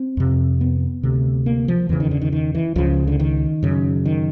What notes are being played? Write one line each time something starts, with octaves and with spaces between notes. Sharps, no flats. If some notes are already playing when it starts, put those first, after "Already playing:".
Already playing: C4
F2 C3
B3
D2 C3
A#3
F3
E2 C#3 E3
D#3
D3
D#3
D#3
E3
C#2 C#3 F3
D3
D#3
F#2 C#3
D#3